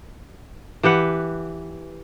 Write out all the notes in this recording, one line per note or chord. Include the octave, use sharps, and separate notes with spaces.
E3 G4 B4 F#5